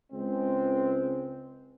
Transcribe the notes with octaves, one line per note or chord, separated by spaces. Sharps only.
C#2 G#3 C4